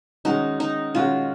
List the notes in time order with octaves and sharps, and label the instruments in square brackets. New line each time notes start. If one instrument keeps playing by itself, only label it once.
[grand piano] D#3 G#3 C#4 F#4 [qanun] D#4
[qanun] D#4
[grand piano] D#3 G#3 C#4 F#4 [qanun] F4